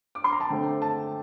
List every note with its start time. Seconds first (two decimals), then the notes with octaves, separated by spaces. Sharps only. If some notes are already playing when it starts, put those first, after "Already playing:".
0.15 D6
0.24 C6
0.32 A#5
0.40 A5
0.50 D3 A3 C4 G5
0.82 A5